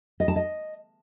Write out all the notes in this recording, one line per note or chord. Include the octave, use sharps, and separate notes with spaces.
D#5
A5
D#5